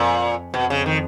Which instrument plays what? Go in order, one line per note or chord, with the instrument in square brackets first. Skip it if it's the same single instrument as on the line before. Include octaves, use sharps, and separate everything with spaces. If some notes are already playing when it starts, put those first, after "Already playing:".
Already playing: [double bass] F2 [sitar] A#2
[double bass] F2 [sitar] B2
[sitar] C#3
D#3